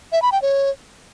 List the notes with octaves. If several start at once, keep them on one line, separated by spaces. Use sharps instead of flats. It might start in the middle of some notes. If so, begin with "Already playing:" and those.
E5
B5
G5
C#5